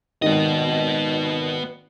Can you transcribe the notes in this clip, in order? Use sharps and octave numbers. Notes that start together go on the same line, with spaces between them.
G#1 D#3 B3 D#5